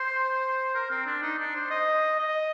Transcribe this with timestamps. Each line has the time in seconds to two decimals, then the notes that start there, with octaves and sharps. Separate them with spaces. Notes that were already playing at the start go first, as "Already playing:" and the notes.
Already playing: C5
0.75 A#4
0.91 C4
1.06 D4
1.22 D#4
1.39 D4
1.55 C5
1.71 D#5
2.19 D#5